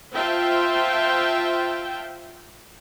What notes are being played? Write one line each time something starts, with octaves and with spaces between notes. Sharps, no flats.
F4 C5 E5 G5 A5